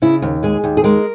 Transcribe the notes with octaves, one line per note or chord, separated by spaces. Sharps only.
C#3 E4
D#2
G#3 G#4
D#2
G#4
G#3 A#4